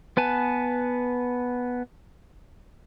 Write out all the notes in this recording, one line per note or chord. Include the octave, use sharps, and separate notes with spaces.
B3 B4 G#5 A5